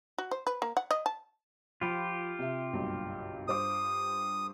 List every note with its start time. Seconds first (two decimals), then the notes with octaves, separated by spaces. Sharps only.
0.18 F#4
0.31 C5
0.47 B4
0.62 A#3
0.77 F#5
0.91 D#5
1.06 A5
1.81 F3 F4 G4 B5
2.39 C3 E5
2.73 F#1 B1 G2
3.48 G2 C5 D6 D#6